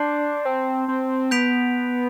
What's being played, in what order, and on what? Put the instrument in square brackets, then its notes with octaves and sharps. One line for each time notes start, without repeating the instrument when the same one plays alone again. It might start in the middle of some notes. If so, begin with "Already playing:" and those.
Already playing: [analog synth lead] D4 [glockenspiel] A5 C6 G6 C7
[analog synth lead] C4
C4
[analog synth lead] B3 [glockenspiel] G6 B6 D7 F7